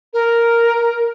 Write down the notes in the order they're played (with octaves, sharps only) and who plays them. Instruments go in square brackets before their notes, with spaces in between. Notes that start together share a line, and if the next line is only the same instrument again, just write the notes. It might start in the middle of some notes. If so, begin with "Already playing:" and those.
[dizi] A#4